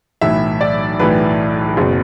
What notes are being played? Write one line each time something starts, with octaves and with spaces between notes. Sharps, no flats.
B1 A2 E3 E5
D5
B1 A2 E3 B4
F#1 B2